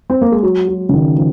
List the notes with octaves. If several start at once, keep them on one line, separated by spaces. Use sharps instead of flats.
C4
A#3
G#3
F#3
F#3
C#3
D#3
F3